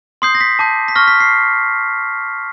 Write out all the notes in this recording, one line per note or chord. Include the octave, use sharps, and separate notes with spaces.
C6 D#6 G6 C7
A#6
B6
A5 D6 G6
B6
C#6 F6 A#6
B6
C7